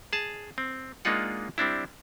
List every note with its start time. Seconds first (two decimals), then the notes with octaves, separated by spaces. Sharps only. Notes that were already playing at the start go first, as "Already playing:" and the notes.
0.13 G#4 A5
0.58 C4
1.05 G#3 A#3 D4 D#4 F4 F#5
1.58 G3 C4 D4 E4